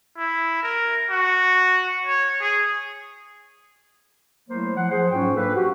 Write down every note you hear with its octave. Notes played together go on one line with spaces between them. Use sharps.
E4
A#4
F#4
C#5
G#4
F#3 A3 A#3 E4 C5
F3 F#5
F3 G#4 C5
G#2 F#3 C#4 F4 C5 G5
A#3 D4 A4 B4
F#4 G4